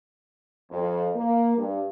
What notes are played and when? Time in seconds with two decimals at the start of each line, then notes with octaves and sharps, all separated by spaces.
0.71 F2
1.15 A#3
1.57 G2